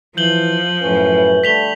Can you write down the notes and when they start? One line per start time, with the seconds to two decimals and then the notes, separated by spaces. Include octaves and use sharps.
0.17 E3 F3 G6 F#7 G7
0.82 F#2 A2 C#4 B4
1.44 D3 G3 A3 B6 F7 G7